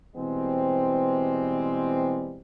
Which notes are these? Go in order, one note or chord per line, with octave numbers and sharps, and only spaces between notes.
B2 E3 G3 G#3 C4